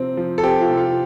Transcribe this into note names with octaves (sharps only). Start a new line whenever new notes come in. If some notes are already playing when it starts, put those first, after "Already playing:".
Already playing: C3 F3 C4
F3
A4
C4 G4
F4
C3
F4